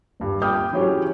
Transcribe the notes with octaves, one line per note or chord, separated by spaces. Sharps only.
D#1 G2
G5 B5 D6 D#6 F6 G6
E3 F#3 C#4 G4 G#4